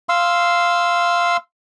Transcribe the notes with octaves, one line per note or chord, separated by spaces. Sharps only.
F5 C6 E6